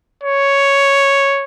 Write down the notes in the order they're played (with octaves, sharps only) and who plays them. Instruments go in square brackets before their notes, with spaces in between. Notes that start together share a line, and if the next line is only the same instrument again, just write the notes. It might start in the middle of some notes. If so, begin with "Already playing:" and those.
[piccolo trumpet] C#5